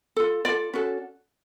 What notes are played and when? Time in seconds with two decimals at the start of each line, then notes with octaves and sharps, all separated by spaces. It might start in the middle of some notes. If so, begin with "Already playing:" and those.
0.16 F4 A4
0.45 F4 A4 D5
0.73 C#4 F#4 A4